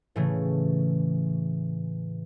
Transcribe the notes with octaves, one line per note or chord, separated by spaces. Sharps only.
A2 C#3 E3 A3